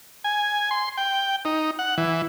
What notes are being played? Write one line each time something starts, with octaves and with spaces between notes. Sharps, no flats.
G#5
C6
G5
D#4
F#5
E3